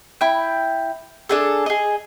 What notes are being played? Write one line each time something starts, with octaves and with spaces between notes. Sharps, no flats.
E4 G5
D4 G#4 A4
G#4 D#5